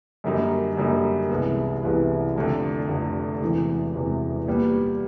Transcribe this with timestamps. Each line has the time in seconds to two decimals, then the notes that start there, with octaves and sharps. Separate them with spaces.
0.24 F#2 D3 G3 A#3 D#4
0.77 F#2 D3 G3 A#3 D#4
1.30 C2 C3 E3 G#3 B3
1.83 C2 C3 E3 G#3 B3
2.35 F1 F2 D3
2.88 F1 F2 D3
3.41 E1 E2 C3 E3
3.94 E1 E2 C3 E3
4.47 A#2 G3 B3